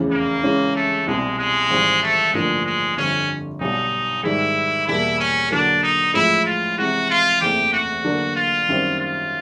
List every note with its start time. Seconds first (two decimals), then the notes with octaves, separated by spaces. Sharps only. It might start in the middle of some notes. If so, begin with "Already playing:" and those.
Already playing: F1 E2 C#3 E3
0.11 A#3
0.43 C#3 E3 G#3 C#4
0.76 A3
1.06 C2 B2 G3 G#3
1.38 G#3
1.70 G#1 G#2 E3 G3
2.03 A3
2.33 A1 G2 D3 F3 G#3 A#3
2.66 G#3
2.97 G1 F2 D3 G3 C#4
3.61 B1 B2 G3 B3 D#4
4.23 G#2 D#3 G3 E4
4.87 E2 B2 G3 A#3 E4
5.19 C#4
5.50 D3 F#3 A#3 D4
5.83 D#4
6.14 A1 A2 F3 G#3 E4
6.46 F4
6.78 C3 E3 G#3 F#4
7.10 F4
7.41 F#1 E2 C3 E3 A3 G4
7.73 F#4
8.04 D3 F#3 A#3 D4
8.36 F4
8.68 F#2 D#3 G3 C4
8.99 F4